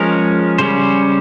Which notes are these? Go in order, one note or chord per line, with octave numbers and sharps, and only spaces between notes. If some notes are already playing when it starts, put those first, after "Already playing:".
Already playing: F3 G#3 C#4 A#4
C#3 G3 C#4 C5